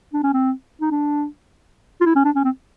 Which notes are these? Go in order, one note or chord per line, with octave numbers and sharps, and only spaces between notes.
D4
C#4
C4
D#4
D4
F4
E4
C#4
D4
C#4
C4